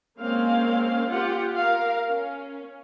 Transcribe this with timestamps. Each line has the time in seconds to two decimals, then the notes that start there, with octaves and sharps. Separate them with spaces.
0.19 G#3 A#3 C4 C#4 F5
1.10 F4 G4 F#5
1.54 A#4 F5
2.07 C#4